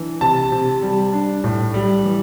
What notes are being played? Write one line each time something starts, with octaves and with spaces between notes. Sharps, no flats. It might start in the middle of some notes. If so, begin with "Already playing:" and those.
Already playing: E3 D4
C3 A5
C3
G3
D4
A2
G3
E3